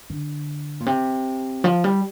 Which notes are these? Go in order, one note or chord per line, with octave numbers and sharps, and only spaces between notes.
D3
A#2
C3
F3
G3